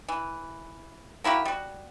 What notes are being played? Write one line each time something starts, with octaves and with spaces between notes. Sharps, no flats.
E3
A#3 E4 F#4 G4
G3 F#4